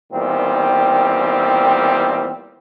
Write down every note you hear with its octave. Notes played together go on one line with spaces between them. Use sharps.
E2 A#2 D#3 G3 C4